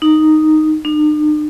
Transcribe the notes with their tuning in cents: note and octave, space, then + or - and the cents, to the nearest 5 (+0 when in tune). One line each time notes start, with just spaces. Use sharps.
D#4 -5
D#4 -45